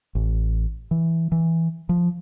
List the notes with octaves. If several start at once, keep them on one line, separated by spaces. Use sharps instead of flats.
A1
E3
E3
F3